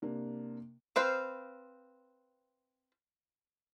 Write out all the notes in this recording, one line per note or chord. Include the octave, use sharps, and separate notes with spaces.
C3 A#3 D4
C4 B4 C5 F5